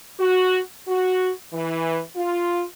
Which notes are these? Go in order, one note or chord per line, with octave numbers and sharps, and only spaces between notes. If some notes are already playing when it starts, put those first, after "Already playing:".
F#4
F#4
E3
F4